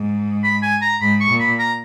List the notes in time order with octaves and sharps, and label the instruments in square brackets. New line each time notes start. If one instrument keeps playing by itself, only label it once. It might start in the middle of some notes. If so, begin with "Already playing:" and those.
Already playing: [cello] G#2
[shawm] B5
G#5
A#5
[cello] G#2 [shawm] B5
[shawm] C#6
[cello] A#2
[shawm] B5
A#5